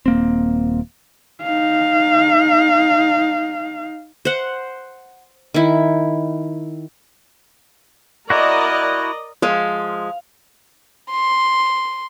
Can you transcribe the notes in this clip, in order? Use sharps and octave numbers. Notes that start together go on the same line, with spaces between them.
D#1 A#3 C4
D#4 F5
C5 F#5
D#3 E4
E4 F#4 A#4 D5 D#5
F3 G#3 F5
C6